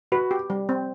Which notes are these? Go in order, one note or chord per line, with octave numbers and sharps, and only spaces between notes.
F#4 B4
G4
G3
C4